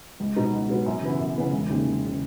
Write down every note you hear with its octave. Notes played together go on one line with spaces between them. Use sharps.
C#2
B2 F#3 B3 D#4
C#2
B2 F#3 B3 D#4
F#2
C#3 E3 B3 E4
F#2
C#3 E3 B3 E4
E1
D#2 C#3
E1
C#3